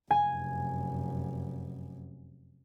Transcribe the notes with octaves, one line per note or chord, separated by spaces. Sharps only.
F1 F#2 G#5